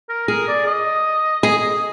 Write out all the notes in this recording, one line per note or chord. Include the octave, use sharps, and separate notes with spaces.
A#4
G#4 A#4
D5
D#5
G#4